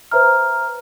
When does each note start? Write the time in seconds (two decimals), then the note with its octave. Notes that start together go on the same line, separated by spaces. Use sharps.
0.11 B4 C5 E5 A#5 F6